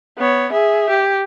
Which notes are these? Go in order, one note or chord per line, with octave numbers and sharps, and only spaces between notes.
B3 C#5
G#4 E5
G4